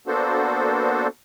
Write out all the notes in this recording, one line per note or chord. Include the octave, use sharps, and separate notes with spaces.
A#3 B3 D4 F#4 A4 C5